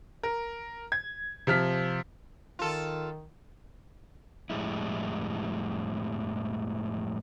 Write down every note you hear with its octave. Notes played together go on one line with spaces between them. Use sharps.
A#4
G#6
C3 F3 F6 B6
D#3 F4 A4
F2 A2 G3 G#3 E4